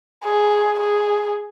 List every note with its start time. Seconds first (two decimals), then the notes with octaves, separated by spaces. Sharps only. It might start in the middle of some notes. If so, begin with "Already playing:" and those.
0.25 G#4
0.80 G#4